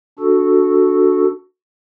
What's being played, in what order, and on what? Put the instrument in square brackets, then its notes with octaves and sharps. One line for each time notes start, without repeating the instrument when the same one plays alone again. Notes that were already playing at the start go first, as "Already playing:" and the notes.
[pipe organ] D4 F#4 A4